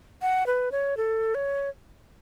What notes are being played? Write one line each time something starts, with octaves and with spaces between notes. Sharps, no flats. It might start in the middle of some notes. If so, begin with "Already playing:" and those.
F#5
B4
C#5
A4
C#5